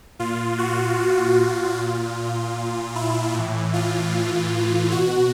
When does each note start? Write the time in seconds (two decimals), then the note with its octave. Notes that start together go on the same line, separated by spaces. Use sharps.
0.19 A#2 F4
0.58 F#4
1.37 F#4
1.77 A#2 F4
2.95 E4
3.34 A2 E3
3.73 F4
4.91 B2 F#4